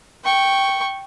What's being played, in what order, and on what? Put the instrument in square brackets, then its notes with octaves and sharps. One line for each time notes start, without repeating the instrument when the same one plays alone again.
[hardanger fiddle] G5 C#6